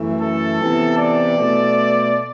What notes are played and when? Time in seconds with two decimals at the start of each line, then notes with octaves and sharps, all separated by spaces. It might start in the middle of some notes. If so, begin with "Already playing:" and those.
Already playing: F#2 E3 A3
0.19 A4
0.59 C3 E3 B3
0.97 D5
1.36 B2 A3